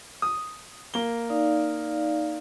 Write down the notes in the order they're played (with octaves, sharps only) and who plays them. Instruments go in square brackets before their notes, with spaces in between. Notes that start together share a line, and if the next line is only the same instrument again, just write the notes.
[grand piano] D#6
A#3 G7
[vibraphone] D#4 D5 F5